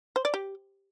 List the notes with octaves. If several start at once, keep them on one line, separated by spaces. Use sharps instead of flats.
C5
D5
G4